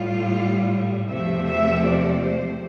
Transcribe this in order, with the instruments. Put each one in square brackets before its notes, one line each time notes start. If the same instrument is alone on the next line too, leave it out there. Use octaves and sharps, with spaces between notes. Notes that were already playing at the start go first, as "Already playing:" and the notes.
Already playing: [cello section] A2 G3 F4
E2 C3 F3 A3 E5
E5
D5
C5